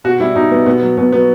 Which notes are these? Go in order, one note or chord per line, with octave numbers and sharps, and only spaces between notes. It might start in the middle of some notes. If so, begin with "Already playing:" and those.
B2 F#4
G3 E4
B2 D#4
G3 B3
B2 B3
F#3
B2 B3
F#3 B3